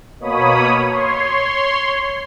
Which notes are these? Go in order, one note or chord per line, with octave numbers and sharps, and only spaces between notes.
B2 A#3 C#5 B5 D#6
C#5 C6